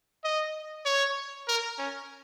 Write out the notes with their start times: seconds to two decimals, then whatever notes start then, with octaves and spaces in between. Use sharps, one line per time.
0.24 D#5
0.86 C#5
1.48 A#4
1.78 C#4